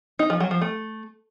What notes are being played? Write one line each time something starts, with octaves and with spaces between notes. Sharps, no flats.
D#4
F3
F#3
F3
A3